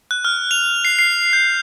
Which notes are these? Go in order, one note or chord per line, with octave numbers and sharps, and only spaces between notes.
F#6
F6
F7
C7
C7
G6